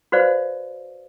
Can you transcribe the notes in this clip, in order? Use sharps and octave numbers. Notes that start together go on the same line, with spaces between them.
F#4 B4 C5 D5 F5